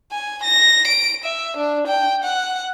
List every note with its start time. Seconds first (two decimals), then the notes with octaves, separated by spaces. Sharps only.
0.12 G#5
0.43 A#6
0.87 D7
1.24 E5
1.57 D4
1.87 G5
2.24 F#5